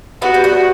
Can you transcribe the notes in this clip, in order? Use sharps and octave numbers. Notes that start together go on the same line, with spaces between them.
B3 F#4
G3
A3